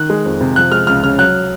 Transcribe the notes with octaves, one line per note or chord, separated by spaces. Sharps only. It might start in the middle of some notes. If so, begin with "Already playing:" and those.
Already playing: D#3 F#6
G#3
F2
C3
F3 F#6
G#3 F6
C#2 F6
C#3 F6
F#3 F#6